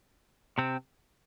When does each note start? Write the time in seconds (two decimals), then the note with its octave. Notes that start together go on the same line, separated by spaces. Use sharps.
0.58 C3 C4